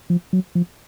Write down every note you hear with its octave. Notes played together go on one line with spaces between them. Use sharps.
F3
F#3
F3